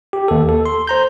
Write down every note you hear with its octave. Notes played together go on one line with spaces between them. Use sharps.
G4
D#2 A4
A4
C6
C5 A#5 G6